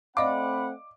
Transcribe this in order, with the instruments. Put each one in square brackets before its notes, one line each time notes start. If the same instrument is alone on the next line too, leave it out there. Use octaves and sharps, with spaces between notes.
[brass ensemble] A3 C4 F#5 [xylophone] D5 D#5 F5 [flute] B5 [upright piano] D6